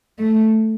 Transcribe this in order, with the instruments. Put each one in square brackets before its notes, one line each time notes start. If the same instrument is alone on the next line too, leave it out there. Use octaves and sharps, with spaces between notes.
[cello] A3